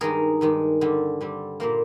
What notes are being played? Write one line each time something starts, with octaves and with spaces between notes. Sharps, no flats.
G2 D#3 G#3 G#4 A#4
G2 D#3 G#3
D3 G3 C4
D3 G3 C4
A#2 G3 A#3 A#4 C5